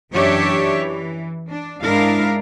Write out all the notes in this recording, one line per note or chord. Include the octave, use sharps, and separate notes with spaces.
F#2 E3 D4 G4 C#5 E5
E3
D4
G#2 G#3 D4 E4 A#4 F5